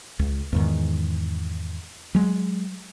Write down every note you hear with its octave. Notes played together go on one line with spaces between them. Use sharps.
C#2
E2 G#2 D#3
F#3 G#3